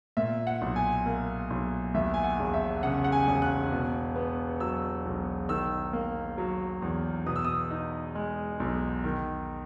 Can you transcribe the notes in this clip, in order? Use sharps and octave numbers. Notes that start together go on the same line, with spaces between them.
A#2 E5
F#5
B1
G#5
A#3
B1
D#2 E5
G#5
F#5
E1
E5
C#3 F#5
F#5
G#5
E1
F#6
B2
B3
F#3 E6
B1
D#3 E6
A#3
F#3
E2
B2 D#6
E6
D#6
D#4
G#3
B1
D#3